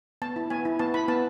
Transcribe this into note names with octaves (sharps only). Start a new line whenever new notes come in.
B3 A5
E4
B3 G#5
E4
B3 A5
E4 B5
B3 A5